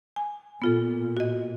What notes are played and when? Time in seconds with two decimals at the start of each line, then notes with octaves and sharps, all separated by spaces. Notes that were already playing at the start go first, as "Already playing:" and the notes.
0.16 G#5
0.62 A#2 B3 F4 A4
1.17 F#4 D#5